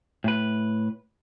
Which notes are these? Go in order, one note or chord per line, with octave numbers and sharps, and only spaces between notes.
A2 B4